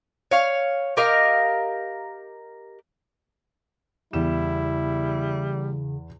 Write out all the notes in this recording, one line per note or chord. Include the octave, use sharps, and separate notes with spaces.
C#5 F5
G4 A#4 D#5 F5
E2 C#3 G3 E4 E7